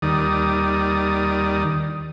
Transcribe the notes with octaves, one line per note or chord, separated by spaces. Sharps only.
D#2 D#3 G3 D5 D#6